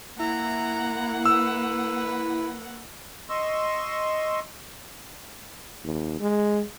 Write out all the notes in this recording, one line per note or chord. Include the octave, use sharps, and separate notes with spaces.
A#3 E4 F#5 A#5
B4 E6
D#5 C6 C#6 E6
D#2
G#3